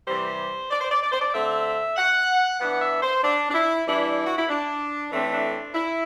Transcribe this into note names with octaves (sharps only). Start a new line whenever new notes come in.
C3 E3 G3 C5
D5
C5
D5
D5
C5
D5
D3 A3 C4 E5
F#5
E3 B3 D4 F#5
E5
C5
D4
D4
E4
E3 G3 D4 E4
F#4
E4
D4
A2 E3 A3 C4 D4
D4
E4